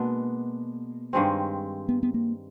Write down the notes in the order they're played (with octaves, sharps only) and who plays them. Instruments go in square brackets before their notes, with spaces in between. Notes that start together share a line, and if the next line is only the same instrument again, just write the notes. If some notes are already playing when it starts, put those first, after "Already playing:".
Already playing: [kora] B2 G#3 B3 D4 [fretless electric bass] A#3
[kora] G2 D#3 G#3 C4
[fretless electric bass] B3
B3
A#3